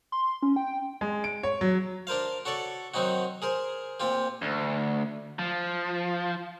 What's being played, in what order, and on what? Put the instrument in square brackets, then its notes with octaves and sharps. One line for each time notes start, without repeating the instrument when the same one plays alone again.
[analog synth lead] C6
C#4
G5
[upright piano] G#3
D7
C#5
F#3
[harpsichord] D4 A#4 C5 F5
F#4 A4 C#5 D5
D#3 F#3 C4 D#4 F#4
G#4 A#4 C5
A#2 C4 F4 G4
[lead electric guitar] D2
F3